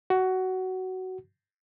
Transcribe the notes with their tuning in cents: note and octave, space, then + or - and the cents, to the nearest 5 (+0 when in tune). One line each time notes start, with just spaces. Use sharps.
F#4 +15